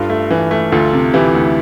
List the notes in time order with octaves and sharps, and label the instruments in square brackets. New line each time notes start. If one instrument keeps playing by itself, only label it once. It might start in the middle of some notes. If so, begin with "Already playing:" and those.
Already playing: [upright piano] G2 [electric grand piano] F4 A4
[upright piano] A3
E3
A3
[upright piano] D2 [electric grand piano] F4 A4
[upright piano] C3
[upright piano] E3 [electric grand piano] E4 G4
[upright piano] D2